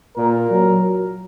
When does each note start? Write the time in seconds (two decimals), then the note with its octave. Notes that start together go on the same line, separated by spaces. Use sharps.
0.17 A#2 A#4
0.50 F#3